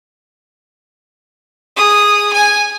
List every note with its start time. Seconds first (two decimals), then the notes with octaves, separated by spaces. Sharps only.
1.76 G#4 D#6
2.33 G#5